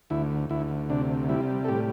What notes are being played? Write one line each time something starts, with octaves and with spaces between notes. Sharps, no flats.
D2 E4
D2 E4
C3 D4
G3 E4
A4
A2 G4